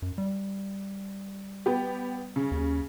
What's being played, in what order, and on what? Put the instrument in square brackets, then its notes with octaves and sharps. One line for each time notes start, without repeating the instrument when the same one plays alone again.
[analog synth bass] F#2
G3
[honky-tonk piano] B3 G4
C#3
[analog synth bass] D#2